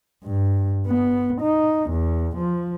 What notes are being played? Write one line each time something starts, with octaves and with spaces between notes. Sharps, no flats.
G2
B3
D#4
E2
F3